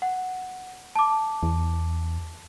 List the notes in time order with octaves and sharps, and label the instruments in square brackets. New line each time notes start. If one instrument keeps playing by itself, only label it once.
[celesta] F#5
A5 D6
[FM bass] E2